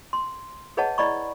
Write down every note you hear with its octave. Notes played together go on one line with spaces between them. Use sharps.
C6
G#4 B4 C#5 D#5 F#5 A5
E4 D5 D#5 B5 C#6